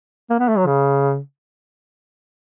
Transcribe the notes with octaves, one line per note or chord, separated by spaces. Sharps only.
A#3
B3
A3
F#3
C#3